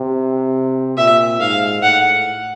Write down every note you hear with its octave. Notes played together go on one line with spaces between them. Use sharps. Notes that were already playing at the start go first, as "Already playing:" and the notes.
Already playing: C3
A#2 E5
G#2 F5
A2 F#5